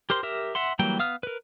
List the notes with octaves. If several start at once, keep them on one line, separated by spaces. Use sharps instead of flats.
G4 A#4 C5 C6
G4 A#4 E5
E5 F#5 C6
E3 F#3 G3 A#3 G5
B3 F5 D#6 F6
A#4 B4